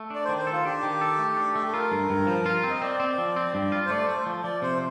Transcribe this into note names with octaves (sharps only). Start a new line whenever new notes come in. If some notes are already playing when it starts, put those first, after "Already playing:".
Already playing: A3
D4 D5
D#3 C5
C5
A4
F4
D4 G4
D#3
A4
A3
D4
A3
A4
F4 A#4
G2
G2
F3
F4
C4
D#5
C4 D5
C4
F3
C4
G2
F4
C5
A3 D5
A3 C5
F3
F3 D5
C3 C5